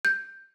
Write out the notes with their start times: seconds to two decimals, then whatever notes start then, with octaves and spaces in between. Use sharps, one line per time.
0.05 G6